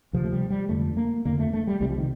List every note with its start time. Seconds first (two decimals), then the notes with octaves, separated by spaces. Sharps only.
0.13 D2 C3 F3
0.24 A3
0.32 G3
0.50 G3
0.69 F2 D3 A3
0.97 A#3
1.25 F2 D3 A#3
1.39 A3
1.53 A3
1.67 G3
1.80 C2 C3 G3
1.89 F3
1.98 D#3